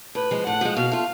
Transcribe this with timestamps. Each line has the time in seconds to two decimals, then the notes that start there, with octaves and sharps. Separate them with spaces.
0.15 A2 B4
0.31 F3 G#3
0.46 A2 F#5
0.61 F3 G#3
0.77 B2 F5
0.92 A3 F4